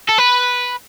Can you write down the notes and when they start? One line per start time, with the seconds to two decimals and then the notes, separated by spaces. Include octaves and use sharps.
0.09 A4
0.18 B4